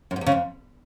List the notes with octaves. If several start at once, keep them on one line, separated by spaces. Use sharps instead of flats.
F#2
G#2
E2
C#3
F2